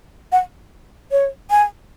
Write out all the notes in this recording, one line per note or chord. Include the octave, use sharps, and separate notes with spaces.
F#5
C#5
G#5